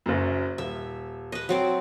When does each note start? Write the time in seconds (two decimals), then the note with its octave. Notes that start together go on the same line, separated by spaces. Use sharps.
0.06 F#1 F#2
0.58 D#1 E5
1.32 B4 D#5
1.49 F#3 C4 D5